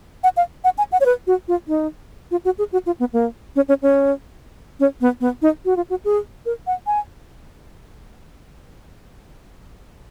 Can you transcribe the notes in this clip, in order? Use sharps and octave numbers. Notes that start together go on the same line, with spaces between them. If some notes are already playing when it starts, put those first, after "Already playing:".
F#5
F5
F#5
G#5
F#5
C#5
B4
F#4
F4
D#4
F4
F#4
G#4
F#4
F4
B3
A#3
C#4
C#4
C#4
C#4
B3
B3
D#4
F#4
F4
F#4
G#4
A#4
F#5
G#5